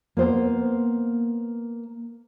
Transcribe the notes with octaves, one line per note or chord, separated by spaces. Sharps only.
A#3 B3 C5